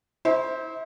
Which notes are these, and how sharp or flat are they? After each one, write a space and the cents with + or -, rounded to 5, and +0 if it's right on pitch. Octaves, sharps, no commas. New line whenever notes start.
E4 -35 C5 +0